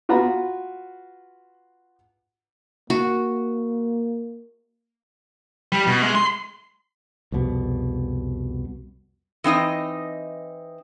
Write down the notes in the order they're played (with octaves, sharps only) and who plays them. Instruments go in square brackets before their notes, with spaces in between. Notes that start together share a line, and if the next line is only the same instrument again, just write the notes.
[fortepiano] F4 F#4 B4 A#5 B5
[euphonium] A#3 [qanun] F#4
[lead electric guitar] G3
B2
G#3
C6
[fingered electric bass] C2 F2 B2
[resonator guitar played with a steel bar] E3 C4 D#4 D#5